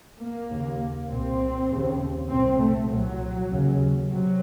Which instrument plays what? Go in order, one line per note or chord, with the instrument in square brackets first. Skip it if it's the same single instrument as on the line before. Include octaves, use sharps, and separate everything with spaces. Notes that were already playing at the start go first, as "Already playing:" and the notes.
[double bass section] A#3
D#2 C#3
C2 A#2 C4
D#2 C#3
C2 A#2 C4
A3
C2 A#2 F#3
D#2 C#3
C3 F#3